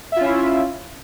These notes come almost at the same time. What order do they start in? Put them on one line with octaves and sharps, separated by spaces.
E5 F4 C#4 E4